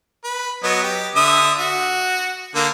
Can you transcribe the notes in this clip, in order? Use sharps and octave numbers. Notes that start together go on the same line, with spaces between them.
B4
F#3 B3 D#5
G4
D3 E5 D#6
F#4
D3 A#3